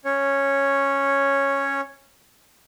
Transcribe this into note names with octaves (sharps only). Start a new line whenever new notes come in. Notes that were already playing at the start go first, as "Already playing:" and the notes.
C#4 C#5